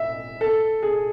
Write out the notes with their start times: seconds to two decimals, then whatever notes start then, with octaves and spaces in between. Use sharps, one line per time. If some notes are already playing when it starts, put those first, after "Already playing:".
Already playing: E5
0.41 A4
0.83 G#4